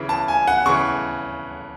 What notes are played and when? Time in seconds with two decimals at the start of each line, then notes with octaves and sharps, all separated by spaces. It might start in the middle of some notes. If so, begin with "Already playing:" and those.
Already playing: C#3 E3
0.09 A5
0.28 G#5
0.47 F#5
0.66 C#3 E3 C#6